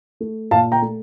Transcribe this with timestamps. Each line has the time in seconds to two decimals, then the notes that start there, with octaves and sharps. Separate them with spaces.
0.20 A3
0.51 A#2 F5 A5
0.72 G5 A#5
0.82 A3